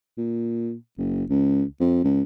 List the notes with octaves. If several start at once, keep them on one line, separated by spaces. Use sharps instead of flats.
A#2
F#1
C#2
F2
C#2